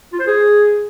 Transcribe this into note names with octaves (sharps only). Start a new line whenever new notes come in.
F4
C5
G#4